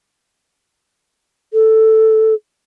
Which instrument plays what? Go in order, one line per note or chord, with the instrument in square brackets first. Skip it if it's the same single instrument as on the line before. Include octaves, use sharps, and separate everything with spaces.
[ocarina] A4